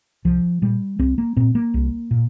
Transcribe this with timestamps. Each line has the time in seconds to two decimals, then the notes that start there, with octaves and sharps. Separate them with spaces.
0.25 C2 F3
0.62 A#2 G3
0.99 C2 C4
1.18 A#3
1.37 A#2 C4
1.55 A#3
1.74 C2
2.11 A#2